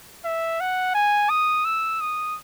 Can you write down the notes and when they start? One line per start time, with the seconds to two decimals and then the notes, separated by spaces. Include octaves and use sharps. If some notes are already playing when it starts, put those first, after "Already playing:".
0.25 E5
0.60 F#5
0.95 G#5
1.29 D#6
1.65 E6
2.01 D#6